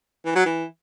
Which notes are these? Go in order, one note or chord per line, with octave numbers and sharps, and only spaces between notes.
E3
F#3
E3